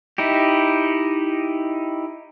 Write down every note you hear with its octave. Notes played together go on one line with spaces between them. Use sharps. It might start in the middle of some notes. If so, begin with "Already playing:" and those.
D#4 E4 G4